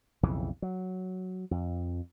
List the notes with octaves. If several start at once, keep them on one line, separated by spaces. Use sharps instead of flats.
B1 F2 C#3 E3
F#3
F2